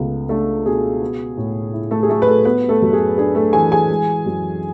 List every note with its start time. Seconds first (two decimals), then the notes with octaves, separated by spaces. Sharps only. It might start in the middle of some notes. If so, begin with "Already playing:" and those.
Already playing: C#2 A3 B3
0.29 A3 D4 A4
0.65 B2 G#4
1.01 B3
1.37 A2
1.73 E4
1.91 A3 A4
2.03 G#4
2.09 F#3 A3 A4
2.22 B4
2.27 A3 A4
2.45 B3 B4
2.69 A3 A4
2.82 F#2
2.93 G#4
3.18 D4 G#4
3.35 A3 A4
3.53 E3 G#4 G#5
3.72 G#4 G#5
3.89 G#3
4.26 F#2